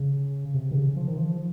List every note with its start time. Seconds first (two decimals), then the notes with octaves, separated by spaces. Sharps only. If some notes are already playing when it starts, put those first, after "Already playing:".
Already playing: C#3
0.54 C3
0.71 D#3
0.75 C#3
0.96 F3
1.08 D#3
1.18 F3